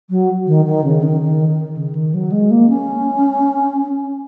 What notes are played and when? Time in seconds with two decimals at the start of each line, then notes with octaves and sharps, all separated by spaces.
0.10 F#3
0.47 D#3
0.65 D#3
0.84 C#3
1.03 D#3
1.21 D#3
1.48 D#3
1.76 C#3
1.95 D#3
2.14 F#3
2.32 G#3
2.51 A#3
2.69 C#4